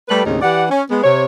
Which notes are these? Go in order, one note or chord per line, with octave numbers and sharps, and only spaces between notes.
G3 A3 G4 A4 B4
D#2 A2 C#3 C4 C#4 D#4
E3 G4 D5 F#5
C#4
G#3 B3
C3 C#5